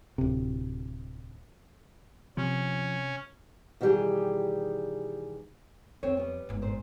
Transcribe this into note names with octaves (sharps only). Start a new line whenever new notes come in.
D1 C3
C3 F3 C#4
B2 D#3 E3 G3 G4 G#4
F2 C4 C5 C#5
G3 B3
G1 G#2
A#2 C5